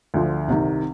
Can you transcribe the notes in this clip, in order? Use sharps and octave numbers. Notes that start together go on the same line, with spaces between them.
D2 D3 F3
C2 C3 D#3